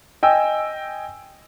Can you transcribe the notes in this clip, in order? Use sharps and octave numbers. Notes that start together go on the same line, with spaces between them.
D#5 G5 G#5 E6